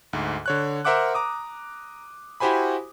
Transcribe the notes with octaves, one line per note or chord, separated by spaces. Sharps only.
D2 G#2
D3 C#5 F#6
A#4 C5 E5 F#5 D6 F#6
A#5 D6 D#6
E4 F#4 G4 C5 G#5 B5